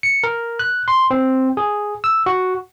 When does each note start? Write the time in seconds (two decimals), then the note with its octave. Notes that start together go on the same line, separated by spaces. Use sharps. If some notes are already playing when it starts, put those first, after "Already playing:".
0.03 C#7
0.24 A#4
0.59 F#6
0.88 C6
1.11 C4
1.57 G#4
2.04 E6
2.26 F#4